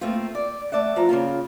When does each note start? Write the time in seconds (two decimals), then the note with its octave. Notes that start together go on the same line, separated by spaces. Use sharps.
0.01 A3 A#3 C4 F4
0.35 D5
0.72 A3 D5 E5 F#5
0.96 F3 E4 A#5
1.09 C#3 F3 A#3 F4